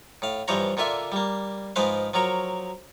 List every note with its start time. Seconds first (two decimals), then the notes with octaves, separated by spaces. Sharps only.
0.22 A2 F5
0.48 G2 E3 F3 C5 C#5 A#5
0.77 A#2 D3 F4 E5 G#5
1.12 G3 A#3
1.76 G#2 F3 G#3 B4 C5 F5
2.14 F3 F#3 A#4 C#5